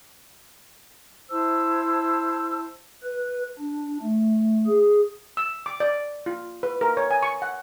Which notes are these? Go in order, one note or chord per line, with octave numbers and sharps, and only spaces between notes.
E4 C5 A5 E6
B4
D4
A3
G#4
E6
D6
D5
F4
B4
A#4
C#5
G#5
C#6
F#5